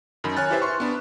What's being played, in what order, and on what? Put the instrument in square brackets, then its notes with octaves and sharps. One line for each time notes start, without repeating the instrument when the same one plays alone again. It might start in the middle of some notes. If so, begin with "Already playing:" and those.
[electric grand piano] F#2 D#3 B5
C#5 G#5 F6 F#6 A6
E4 G4 B4 C5 E5
C6 C#6
B3 D4 B5